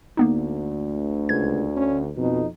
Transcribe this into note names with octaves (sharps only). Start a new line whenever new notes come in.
D2 A#3 B3 D#4
C#2 G#6
C#4
F2 B2 D#4